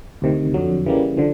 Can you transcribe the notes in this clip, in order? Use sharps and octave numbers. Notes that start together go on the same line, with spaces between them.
D2 C3 D#3
F2 D3 F#3
C#3 E3 G3 A#3
D3 F3